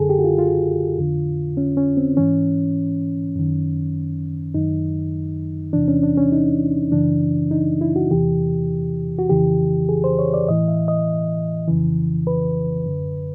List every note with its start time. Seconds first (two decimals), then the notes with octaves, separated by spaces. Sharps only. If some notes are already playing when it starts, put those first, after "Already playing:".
Already playing: F#2 D3 G#4 A4
0.09 G4
0.19 F#4
0.24 F4
0.38 F4
0.98 F2 D3
1.57 C#4
1.77 C#4
1.97 C4
2.17 G#2 E3 C#4
3.36 F#2 D#3
4.54 F#2 D#3 D#4
5.73 E2 C3 E3 D4
5.88 C#4
6.03 D4
6.18 C#4
6.32 D#4
6.92 F#2 C#3 E3 D4
7.51 D#4
7.81 E4
7.96 F#4
8.11 E2 C3 E3 G4
9.19 F#4
9.29 F2 C#3 E3 G4
9.89 G#4
10.04 C5
10.19 C#5
10.34 D5
10.48 A2 E3 D#5
10.68 E5
10.88 D#5
11.67 F2 C#3 E3
12.27 B4
12.86 F#2 D3